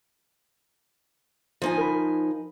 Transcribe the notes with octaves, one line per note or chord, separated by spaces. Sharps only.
F3 D#4 G#5
A#4 B5